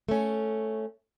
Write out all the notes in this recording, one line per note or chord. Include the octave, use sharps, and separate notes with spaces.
A3 C#4